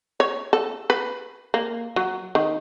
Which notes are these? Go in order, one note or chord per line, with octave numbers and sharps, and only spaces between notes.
C#5
A4
B4
A#3
F#3
D#3